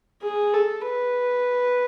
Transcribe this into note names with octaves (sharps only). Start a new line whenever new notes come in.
G#4
A4
B4